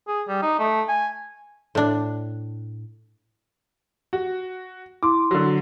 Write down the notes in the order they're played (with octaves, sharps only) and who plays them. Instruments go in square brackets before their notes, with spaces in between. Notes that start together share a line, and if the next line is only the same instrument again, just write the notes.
[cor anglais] G#4
G3
D#4
A3
G#5
[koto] A2 D4
[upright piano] F#4
[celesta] E4 C6 [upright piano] D6
[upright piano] D3 F#3